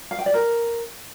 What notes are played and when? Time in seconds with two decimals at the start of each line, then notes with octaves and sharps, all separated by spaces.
0.11 F5
0.19 G5
0.26 D5
0.34 A#4